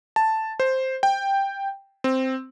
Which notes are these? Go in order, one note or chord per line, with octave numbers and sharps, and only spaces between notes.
A5
C5
G5
C4